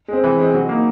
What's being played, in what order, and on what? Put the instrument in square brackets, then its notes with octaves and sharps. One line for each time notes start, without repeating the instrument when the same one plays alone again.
[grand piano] G#3 C4
E3
G#3 C4
F#3
A#3 D#4